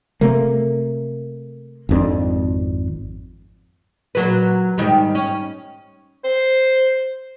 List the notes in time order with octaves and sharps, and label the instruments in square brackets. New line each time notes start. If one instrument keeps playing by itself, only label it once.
[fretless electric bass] C3 A3 A#3
G#1 F2 D4
[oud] A#2 F#3 B4
G#2 D#3 G3
C#4
[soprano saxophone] C5